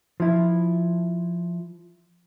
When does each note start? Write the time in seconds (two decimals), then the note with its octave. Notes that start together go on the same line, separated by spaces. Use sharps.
0.20 F3 E4